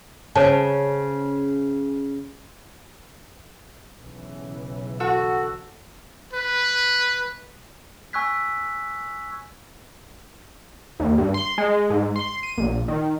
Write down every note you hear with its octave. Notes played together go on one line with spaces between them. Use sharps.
C#3 C5 C#5 A5
B1 C#3 E3
F#4 A4 F#5 E6
B4
G#5 C#6 E6 F#6 G#6 B6
D#2
G2
C6
G#3
G#2
C6
D#7
A#1
D#3